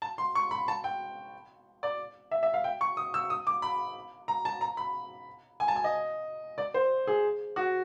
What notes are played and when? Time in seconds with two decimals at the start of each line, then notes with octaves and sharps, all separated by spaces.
0.02 A5
0.18 C6
0.35 C#6
0.51 B5
0.68 A5
0.84 G5
1.83 D5
2.31 E5
2.43 E5
2.54 F5
2.64 G5
2.81 C#6
2.97 D#6
3.14 E6
3.30 D#6
3.47 D6
3.62 B5
4.28 A#5
4.45 A5
4.61 A#5
4.77 B5
5.60 G#5
5.68 A5
5.76 G#5
5.84 D#5
6.58 D5
6.74 C5
7.07 G#4
7.56 F#4